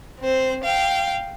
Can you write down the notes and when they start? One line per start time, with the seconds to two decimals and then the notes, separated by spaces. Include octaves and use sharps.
0.20 C4 C5
0.64 F5 G5